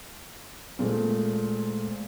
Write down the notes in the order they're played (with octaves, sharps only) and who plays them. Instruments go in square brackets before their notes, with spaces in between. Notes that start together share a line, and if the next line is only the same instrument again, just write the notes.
[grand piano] A#2 G#3 A3 C4